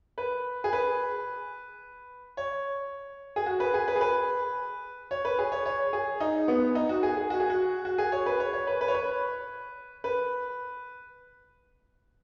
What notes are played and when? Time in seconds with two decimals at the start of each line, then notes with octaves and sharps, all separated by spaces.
0.18 B4
0.64 G#4
0.73 B4
2.37 C#5
3.36 G#4
3.46 F#4
3.60 B4
3.74 G#4
3.88 B4
3.96 G#4
4.01 B4
5.11 C#5
5.25 B4
5.39 G#4
5.52 C#5
5.66 C#5
5.93 G#4
6.20 D#4
6.48 B3
6.75 D#4
6.89 F#4
7.03 G#4
7.17 G#4
7.30 F#4
7.40 G#4
7.50 F#4
7.85 F#4
7.98 G#4
8.12 C#5
8.26 B4
8.40 C#5
8.53 C#5
8.67 B4
8.81 B4
8.88 C#5
8.95 B4
10.04 B4